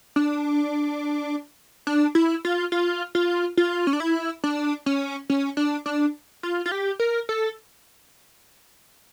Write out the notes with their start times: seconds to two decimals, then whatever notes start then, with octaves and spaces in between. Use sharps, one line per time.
0.16 D4
1.87 D4
2.15 E4
2.45 F4
2.72 F4
3.15 F4
3.57 F4
3.87 C#4
3.93 D4
4.00 E4
4.44 D4
4.86 C#4
5.30 C#4
5.57 D4
5.86 D4
6.43 F4
6.66 F4
6.72 G4
7.00 A#4
7.29 A4